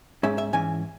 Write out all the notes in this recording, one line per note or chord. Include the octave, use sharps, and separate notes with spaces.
G#2 G#3 C#4 E5
E5
G#2 E3 C#4 G#5